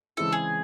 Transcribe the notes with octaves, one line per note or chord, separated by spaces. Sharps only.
C#3 E3 G#3 C4 E4 A4
G#4